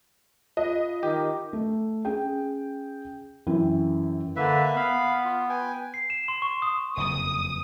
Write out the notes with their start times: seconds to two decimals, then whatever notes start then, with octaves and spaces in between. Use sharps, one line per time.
0.57 F4 D#5
1.03 D#3 G4
1.53 A3
2.05 C#4 G#4 G5
3.47 F#2 E3 E4 G5
4.36 D3 A#3 B4 E5
4.76 B3 F5 B5
5.25 F4
5.49 B4 G5 G#5
5.94 C7
6.10 E7
6.28 C6
6.42 C#6
6.62 D#6
6.97 F#1 F2 D#6